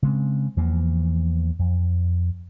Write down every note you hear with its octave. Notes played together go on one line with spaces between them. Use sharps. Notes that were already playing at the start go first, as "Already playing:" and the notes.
C#3 G#3 C4
E2 E3 F3 A#3
F2